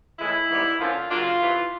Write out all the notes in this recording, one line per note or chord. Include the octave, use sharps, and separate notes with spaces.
A2 E3 G#3 E4
G#2 E3 G3 B3
D3 F3 A#3 C#4 F4
C#3 F#3 A#3 D4 F4
C3 E3 A3